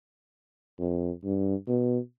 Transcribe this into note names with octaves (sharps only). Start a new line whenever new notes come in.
F2
G2
B2